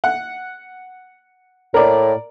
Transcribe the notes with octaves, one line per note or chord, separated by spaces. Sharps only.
F#5
A2 A#4 D5